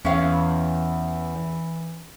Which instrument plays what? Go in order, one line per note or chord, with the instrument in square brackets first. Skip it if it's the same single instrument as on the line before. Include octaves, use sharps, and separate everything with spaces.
[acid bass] E2 [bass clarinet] E3 [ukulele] C#4 F5